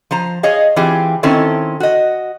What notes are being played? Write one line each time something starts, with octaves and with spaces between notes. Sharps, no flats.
F3 C5 A#5
G#4 C#5 D#5 F5
E3 C4 F4 G4 G#4
D#3 C4 C#4 E4 A4
F#4 D#5